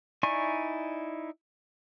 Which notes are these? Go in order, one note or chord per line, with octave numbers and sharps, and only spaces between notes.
D#4 E4 D5 G#5 C#6